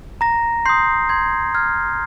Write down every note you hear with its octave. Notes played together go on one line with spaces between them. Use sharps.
A#5 A#6
C6 D#6 G6 C7
C6 G#6
F6 G#6